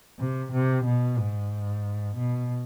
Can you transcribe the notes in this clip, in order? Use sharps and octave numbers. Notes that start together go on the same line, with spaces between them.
C3
C3
B2
G#2
B2